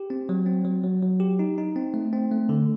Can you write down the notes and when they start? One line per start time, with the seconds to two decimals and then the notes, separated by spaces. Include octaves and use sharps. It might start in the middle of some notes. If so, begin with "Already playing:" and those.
Already playing: G4
0.10 C4
0.29 F#3
0.46 C4
0.65 F#3
0.84 F#3
1.03 F#3
1.20 G4
1.39 D#4
1.58 D#4
1.76 C4
1.94 A3
2.13 C4
2.32 A3
2.49 D3